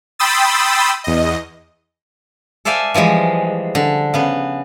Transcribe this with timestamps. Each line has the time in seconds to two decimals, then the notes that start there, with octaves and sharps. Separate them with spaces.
0.19 G5 B5 C6 D#6 E6 A6
1.04 E2 D#5
2.65 A4 C5 D5 E5 F5 G#5
2.94 E3 F3 G3 G#3
3.75 D3
4.14 C#3 B3